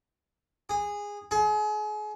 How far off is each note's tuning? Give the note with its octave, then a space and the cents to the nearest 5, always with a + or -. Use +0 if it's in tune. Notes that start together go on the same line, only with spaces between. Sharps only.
G#4 -15
G#4 +35